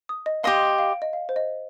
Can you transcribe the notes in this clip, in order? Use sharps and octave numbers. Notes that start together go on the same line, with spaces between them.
D#6
D#5
G4 D#5 F5 C6
F5
D#5
F5
C5
D#5